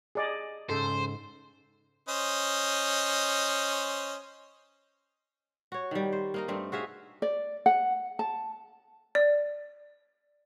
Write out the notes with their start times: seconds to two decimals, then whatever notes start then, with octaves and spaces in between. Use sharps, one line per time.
0.15 G#4 D5 D#5
0.70 G#2 C#3 A4 C5
2.08 C#4 C5 D#5
5.72 F#4 C#5
5.91 D#3 G3
6.12 C5
6.34 A#3 D#4 A#4
6.48 G2 A3 C4
6.72 F#4 G#4 E5 F5
7.22 D5
7.66 F#5
8.19 A5
9.15 D5